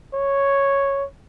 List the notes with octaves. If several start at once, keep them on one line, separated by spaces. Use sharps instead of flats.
C#5